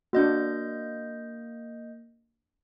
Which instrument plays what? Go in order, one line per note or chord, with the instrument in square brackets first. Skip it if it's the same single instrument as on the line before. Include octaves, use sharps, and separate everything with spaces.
[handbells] A#3 D#5 G6 [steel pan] D4 F#4